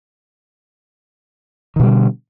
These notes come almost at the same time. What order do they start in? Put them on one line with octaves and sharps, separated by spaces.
D#3 B2 G3 D3